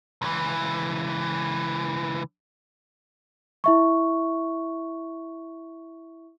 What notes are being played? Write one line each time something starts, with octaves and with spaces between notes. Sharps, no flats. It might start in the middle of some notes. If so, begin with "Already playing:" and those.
C#2 E3
E4 E5 C#6